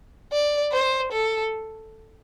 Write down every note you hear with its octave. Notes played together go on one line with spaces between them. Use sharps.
D5
C5
A4